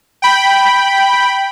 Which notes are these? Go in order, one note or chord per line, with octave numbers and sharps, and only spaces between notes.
G5 B5